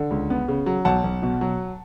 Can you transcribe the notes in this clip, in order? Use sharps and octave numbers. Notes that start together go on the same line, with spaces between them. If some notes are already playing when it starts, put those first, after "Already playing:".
Already playing: D3
C#2
B3
C#3
F#3
B1 F#5 A5
B1
B2
F#3